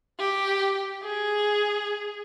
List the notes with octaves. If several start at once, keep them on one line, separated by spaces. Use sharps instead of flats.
G4
G#4